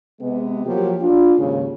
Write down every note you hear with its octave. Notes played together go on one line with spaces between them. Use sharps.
C3 G#3 B3
F3 F#3 A#3 G4
D4 F4
D#2 G#2 C#3